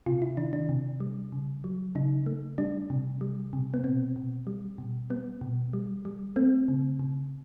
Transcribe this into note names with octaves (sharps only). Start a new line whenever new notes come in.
C3 F4
E4
D#3 D4
D4
C3
G3
C#3
F#3
C#3 D#4
A3
G3 D4
C3
G3
C3
B3
B2 C4
B2
G3
B2
G3 B3
B2
G3
G3
A3 C4
C#3
C#3